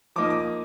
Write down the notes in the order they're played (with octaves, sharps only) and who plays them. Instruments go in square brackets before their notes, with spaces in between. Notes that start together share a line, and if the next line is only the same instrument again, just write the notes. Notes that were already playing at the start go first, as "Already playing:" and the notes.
[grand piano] F3 A#3 D#4 D6
D#6
D6